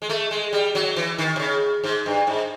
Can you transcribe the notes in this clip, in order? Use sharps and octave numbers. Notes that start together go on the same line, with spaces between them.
G#3
A3
G#3
G3
F#3
E3
D#3
C3
C#3
G#2
G2
G#2